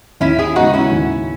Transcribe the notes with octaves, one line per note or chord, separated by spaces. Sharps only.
D#2 C#4 E4
E4 G#4
C#3 G#3 B3 D#4 F#4
C#4 E4
D#2